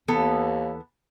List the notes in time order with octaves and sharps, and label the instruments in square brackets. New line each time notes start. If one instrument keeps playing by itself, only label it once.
[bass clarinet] D#2 [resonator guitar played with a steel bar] E3 B3 A4